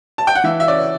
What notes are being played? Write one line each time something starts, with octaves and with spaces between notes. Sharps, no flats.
A5
G5
F#5
E3 E5
E5
C#4 D5